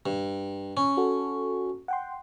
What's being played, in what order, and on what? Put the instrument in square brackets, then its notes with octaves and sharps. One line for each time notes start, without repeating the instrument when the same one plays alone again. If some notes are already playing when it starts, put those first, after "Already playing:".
[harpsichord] G2
C#4
[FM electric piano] F#4 A4
F#5 G5 C6